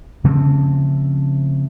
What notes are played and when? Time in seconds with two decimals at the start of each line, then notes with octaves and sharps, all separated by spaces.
0.24 C#3 F3 A3 C4